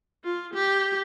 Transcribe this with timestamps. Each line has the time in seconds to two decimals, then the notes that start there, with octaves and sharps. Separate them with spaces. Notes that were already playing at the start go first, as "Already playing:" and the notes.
0.24 F4
0.54 G4